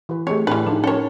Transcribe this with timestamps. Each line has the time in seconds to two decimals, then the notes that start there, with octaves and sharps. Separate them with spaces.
0.09 E3 B4
0.27 A3 C4 G4 G#4 C#5 D#5
0.47 A2 E3 D4 B4 G5 F6
0.67 F3 D4 D#4 A5
0.84 C#4 A4 A#4 C#5